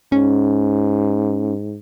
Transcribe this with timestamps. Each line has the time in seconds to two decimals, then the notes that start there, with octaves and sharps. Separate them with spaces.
0.12 G#2 C#4